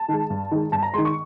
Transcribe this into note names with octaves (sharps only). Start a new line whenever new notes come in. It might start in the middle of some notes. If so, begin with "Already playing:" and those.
Already playing: A5
D#3 G#3
G2
D#3 G#3
G2 A5
A#5
D#3 G#3 C6
C#6